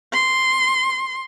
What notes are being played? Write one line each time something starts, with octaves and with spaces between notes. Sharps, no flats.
C6